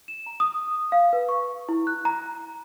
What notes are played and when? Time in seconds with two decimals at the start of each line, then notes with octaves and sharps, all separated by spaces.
0.08 E7
0.26 A#5
0.40 D#6
0.92 F5
1.13 B4
1.29 C#6
1.69 E4
1.87 F#6
2.05 A#5